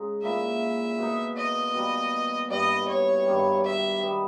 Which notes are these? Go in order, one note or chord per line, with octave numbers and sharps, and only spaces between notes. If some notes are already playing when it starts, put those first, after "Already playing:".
Already playing: C#3 G#3 D#4
A#2 A#3 E4 E5
B2 A#3 D#4
D#5
B2 G3 A#3
G2 G3 B3 E4 D#5
C#5
G2 D#3 G3
E5
D#3 G3 B3